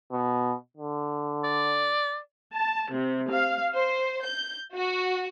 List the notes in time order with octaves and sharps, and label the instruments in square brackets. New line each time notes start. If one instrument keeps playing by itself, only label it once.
[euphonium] B2
D3
[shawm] D5
[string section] A5
C3
F5
C5
G6
F#4